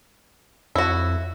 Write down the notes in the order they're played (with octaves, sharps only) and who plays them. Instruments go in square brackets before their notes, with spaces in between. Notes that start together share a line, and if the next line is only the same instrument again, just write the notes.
[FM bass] F2 [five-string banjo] E4 F#4